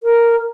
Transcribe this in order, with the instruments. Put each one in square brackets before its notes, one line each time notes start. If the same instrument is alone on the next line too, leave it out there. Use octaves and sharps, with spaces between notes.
[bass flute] A#4